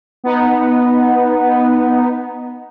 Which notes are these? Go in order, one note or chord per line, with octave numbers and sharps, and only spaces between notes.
B3 D#4